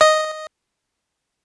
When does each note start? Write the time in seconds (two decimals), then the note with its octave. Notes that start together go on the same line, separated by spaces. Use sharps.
0.01 D#5